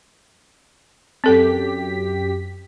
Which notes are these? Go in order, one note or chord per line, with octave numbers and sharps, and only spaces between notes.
F#2 C4 G4 A4 B6